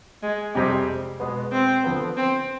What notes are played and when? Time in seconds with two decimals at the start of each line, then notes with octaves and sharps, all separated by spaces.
0.22 G#3
0.55 F2 C3 G3 G#3 C4 G4
1.20 B2 G#3 B3
1.52 C4
1.84 D3 F3 B3
2.17 C4